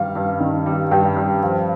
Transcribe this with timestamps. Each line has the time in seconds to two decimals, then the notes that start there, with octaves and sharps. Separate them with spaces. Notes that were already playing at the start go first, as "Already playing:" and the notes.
Already playing: G2 D#3 G3 F5
0.15 G2
0.40 D#3
0.66 G3
0.91 G2 G5
1.17 G2
1.43 F3 F5